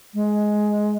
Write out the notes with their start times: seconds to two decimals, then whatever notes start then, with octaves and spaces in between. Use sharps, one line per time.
0.14 G#3